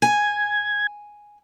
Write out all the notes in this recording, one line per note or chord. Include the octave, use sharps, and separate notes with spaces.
G#5 G#6